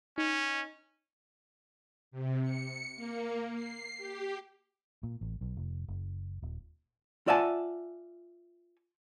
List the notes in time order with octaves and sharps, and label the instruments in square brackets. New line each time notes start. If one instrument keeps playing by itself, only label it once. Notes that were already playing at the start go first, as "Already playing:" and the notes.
[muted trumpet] C#4 [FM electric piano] D#4
[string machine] C3
C#7
A#3
C7
G4
[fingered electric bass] A#2
A1
B1
F1
F#1
D#1
[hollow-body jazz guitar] F4 D5 E5 F#5 G#5 A5